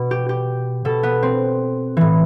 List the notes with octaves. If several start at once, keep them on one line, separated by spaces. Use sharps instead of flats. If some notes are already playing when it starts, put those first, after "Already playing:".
Already playing: B2
G4
G4
B2 A4
B3
C4
A2 E3